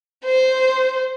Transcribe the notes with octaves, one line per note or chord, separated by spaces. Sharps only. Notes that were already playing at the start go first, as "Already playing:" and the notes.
C5